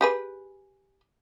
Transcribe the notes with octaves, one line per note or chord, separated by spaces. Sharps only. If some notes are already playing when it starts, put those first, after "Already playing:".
G4 G#4 B4